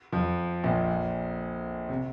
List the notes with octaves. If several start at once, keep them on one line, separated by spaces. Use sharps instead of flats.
F2 F3
A#1 A#2
C3